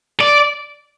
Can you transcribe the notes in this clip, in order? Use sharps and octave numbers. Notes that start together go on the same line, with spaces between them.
D5